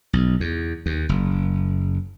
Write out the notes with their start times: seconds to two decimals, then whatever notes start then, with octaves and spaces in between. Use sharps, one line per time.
0.13 B1
0.40 E2
0.86 D#2
1.09 F#1